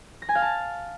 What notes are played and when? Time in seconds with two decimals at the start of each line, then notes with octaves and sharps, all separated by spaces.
0.22 A#6
0.29 G#5
0.35 F5
0.42 A5